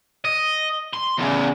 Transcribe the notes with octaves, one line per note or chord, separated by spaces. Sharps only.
D#5
C6
E2 C#3